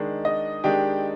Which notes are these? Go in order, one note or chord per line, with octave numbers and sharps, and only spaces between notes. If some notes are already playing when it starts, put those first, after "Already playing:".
Already playing: D#3 G#3 D4
D#5
D#3 G#3 D4 G4 G5